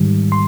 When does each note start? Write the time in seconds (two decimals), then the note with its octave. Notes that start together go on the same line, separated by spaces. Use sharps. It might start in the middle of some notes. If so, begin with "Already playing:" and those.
Already playing: G#2 D#3 G3
0.32 C6